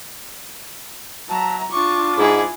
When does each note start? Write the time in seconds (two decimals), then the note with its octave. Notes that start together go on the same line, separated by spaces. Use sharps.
1.29 F#3 E5 A5 A#5
1.72 D4 F4 C#6 D6
2.17 G#2 E4 G#4